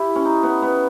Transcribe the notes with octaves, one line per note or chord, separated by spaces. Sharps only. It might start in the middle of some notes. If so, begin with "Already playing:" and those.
Already playing: E4 G4
C#4
D#4
B3
B3